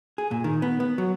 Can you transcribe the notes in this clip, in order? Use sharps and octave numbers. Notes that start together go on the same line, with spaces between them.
G#4
A#2
D#3
B3
B3
F#3